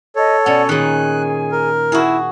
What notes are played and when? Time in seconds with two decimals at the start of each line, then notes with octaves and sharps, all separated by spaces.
0.16 A4 C#5 D#5
0.46 B2 C#4 D5 F#5
0.69 A#2 D#3 G#4 G#5 F#6
1.52 A#4
1.92 E4 F#4 G#4